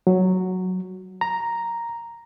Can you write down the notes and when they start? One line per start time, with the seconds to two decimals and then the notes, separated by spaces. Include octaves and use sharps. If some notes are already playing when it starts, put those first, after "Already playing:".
0.07 F#3
1.21 A#5